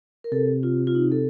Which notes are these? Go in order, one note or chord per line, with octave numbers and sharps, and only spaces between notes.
A#4
C3 A4
F4
F4
D#4
A4